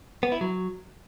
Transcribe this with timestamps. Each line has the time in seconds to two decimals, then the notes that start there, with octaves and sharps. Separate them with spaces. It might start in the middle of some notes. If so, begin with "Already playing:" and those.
0.23 B3
0.32 E4
0.41 F#3